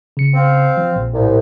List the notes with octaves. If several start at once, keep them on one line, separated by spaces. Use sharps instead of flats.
C#3 C#7
C4 F5
F3
A#1 A#2
C2 A2